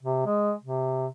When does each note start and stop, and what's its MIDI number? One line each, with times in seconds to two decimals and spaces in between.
0.03 0.22 48
0.26 0.53 56
0.64 1.07 48